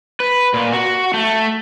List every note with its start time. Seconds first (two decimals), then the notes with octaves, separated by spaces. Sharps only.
0.20 B4
0.54 A#2
0.72 F#4
1.14 A3